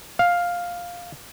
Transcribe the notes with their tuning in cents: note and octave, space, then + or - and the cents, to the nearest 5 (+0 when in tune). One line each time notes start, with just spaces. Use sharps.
F5 +5